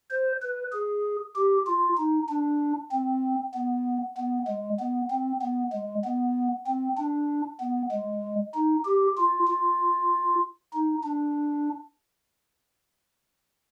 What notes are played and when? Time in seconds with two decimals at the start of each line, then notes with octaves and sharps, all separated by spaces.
0.10 C5
0.42 B4
0.73 G#4
1.35 G4
1.66 F4
1.97 D#4
2.29 D4
2.91 C4
3.54 B3
4.17 B3
4.48 G#3
4.79 B3
5.10 C4
5.41 B3
5.73 G#3
6.04 B3
6.66 C4
6.98 D4
7.60 B3
7.91 G#3
8.54 D#4
8.85 G4
9.17 F4
9.47 F4
10.73 D#4
11.04 D4